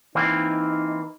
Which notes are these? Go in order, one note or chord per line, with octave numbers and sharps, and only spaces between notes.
E3 A#3 C4 D#4